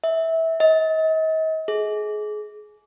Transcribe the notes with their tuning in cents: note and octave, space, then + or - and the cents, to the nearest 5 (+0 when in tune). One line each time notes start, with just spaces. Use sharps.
E5 -20
D#5 +40
G#4 +25